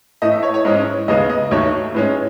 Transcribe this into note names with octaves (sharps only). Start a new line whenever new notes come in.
A2 E3 A3 D#5
E5
C#5
C#5
G#2 E3 G#3 C#4 D#5
D#2 C#3 G#3 B3 D#5
D#5
D#2 D#3 F#3 A3 C#5
A2 G#3 C#4 B4